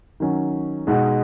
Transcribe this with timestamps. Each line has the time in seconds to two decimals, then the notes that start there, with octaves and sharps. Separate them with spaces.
0.20 D#3 F#3 C#4
0.87 B2 G#3 D#4